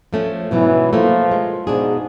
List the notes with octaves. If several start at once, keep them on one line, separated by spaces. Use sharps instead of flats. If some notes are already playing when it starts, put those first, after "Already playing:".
F3 A3 C#4
G#2 B2 E3 F#3
F3 A3 A#3
G#3
G#2 B2 D4 G#4